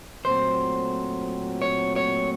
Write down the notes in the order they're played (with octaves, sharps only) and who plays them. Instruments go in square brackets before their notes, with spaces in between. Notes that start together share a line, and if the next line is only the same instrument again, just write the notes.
[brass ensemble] A#2 F#3 A3 C4 [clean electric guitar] C5
[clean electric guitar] C#5
C#5